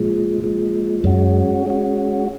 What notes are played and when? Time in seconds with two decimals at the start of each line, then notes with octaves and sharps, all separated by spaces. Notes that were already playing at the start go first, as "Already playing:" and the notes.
Already playing: A#2 F3 G#3
0.41 A#2 F3 G#3
1.04 F#2 G#3 C#4 F#4
1.66 G#3 C#4 F#4